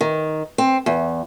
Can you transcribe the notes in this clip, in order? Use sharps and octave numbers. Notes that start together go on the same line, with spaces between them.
D#3
C4
E2